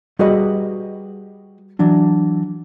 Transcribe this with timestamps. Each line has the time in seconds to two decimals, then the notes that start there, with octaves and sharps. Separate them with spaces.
0.19 G3 F#4 G#4 B4 D#5
1.79 E3 F#3 D4